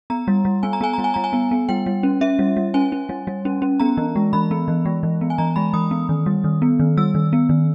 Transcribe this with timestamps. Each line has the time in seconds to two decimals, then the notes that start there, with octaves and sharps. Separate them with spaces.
0.10 B3 A#5
0.28 G3
0.45 G3
0.63 B3 G#5
0.73 A#5
0.81 B3 G#5
0.93 G3 A#5
1.04 G#5
1.14 G3 A#5
1.24 G#5
1.33 B3
1.51 B3
1.69 G3 G5
1.86 G3
2.03 C#4
2.21 C#4 E5
2.39 G3
2.57 G3
2.74 C#4 G#5
2.92 C#4
3.09 G3
3.27 G3
3.45 C#4
3.62 C#4
3.80 B3 A#5
3.97 E3
4.16 G#3
4.33 E3 B5
4.51 B3
4.68 E3
4.85 G#3
5.03 E3
5.21 B3
5.30 G#5
5.38 E3 A#5
5.56 G#3 B5
5.73 E3 D#6
5.91 B3
6.09 D#3
6.26 G3
6.44 D#3
6.62 B3
6.80 D#3
6.97 G3 E6
7.15 D#3
7.33 B3
7.49 D#3